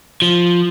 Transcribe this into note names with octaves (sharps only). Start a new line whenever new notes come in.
F3